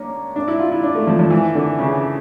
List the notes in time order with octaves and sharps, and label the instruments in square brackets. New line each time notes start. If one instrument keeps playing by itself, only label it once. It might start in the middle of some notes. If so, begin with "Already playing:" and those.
Already playing: [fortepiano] A#3 C#4 D4
D4
E4
F4
E4
D4
A3
F3
F3
E3
D3
C#3